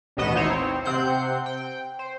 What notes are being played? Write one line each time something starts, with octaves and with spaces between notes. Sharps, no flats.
A1 D#2 B2 B3 D#5 E7
D#4 E4 C5 C#5
C4
C3 C4 F#5 G6 C7
G5
C5